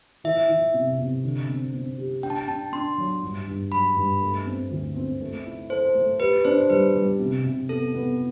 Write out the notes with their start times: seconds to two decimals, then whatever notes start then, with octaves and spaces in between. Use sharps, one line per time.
0.24 E3 E5
0.49 E3
0.74 C3
0.98 C3
1.24 D3
1.49 C4
1.73 C4
1.98 G4
2.23 D4 G5
2.30 A5
2.38 G5
2.47 D4 A5
2.73 D4 C6
2.98 F#3
3.22 G2
3.47 G2
3.72 F#3 B5
3.96 G2
4.21 A3
4.46 C4
4.71 D2
4.96 C4
5.21 A3
5.46 E4
5.70 A4 C5
5.95 A3
6.20 G4 B4
6.45 D4 C5
6.70 G3 B4
6.95 G3
7.20 C3
7.44 C3
7.69 B3 A4
7.94 B3